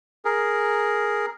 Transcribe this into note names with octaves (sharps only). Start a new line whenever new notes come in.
G#4 A#4